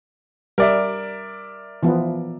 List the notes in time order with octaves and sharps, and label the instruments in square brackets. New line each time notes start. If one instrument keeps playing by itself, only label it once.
[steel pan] G3 [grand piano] A#4 D5 E5
[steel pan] E3 F3 B3